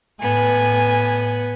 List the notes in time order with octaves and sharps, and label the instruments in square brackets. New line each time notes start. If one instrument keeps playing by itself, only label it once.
[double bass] A2 [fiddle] B3 [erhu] G#5